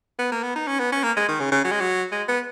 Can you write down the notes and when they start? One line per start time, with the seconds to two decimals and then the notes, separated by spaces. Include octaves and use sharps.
0.19 B3
0.32 A#3
0.43 B3
0.56 D#4
0.68 C#4
0.79 B3
0.92 C#4
1.03 A#3
1.16 G#3
1.28 D#3
1.40 C#3
1.52 C#3
1.65 F#3
1.72 G#3
1.81 F#3
2.12 G#3
2.28 B3